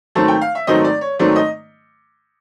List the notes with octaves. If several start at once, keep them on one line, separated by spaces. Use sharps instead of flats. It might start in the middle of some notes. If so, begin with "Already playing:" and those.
G#2 D#3 F#3 A3 C4 A5
G5
F5
E5
G#2 D#3 F#3 A3 C4 D#5
D5
C#5
G#2 D#3 F#3 A3 C4 D5
D#5